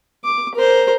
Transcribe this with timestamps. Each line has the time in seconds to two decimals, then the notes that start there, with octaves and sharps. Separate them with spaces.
0.24 D6
0.55 A#4 C5